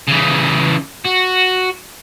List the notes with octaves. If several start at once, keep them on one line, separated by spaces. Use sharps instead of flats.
C#3 E3
F#4